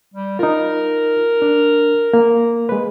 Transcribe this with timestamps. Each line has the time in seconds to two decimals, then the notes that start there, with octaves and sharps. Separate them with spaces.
0.14 G3
0.39 D#4 F4 A#4
1.42 D4
2.13 A#3
2.69 G#3 B4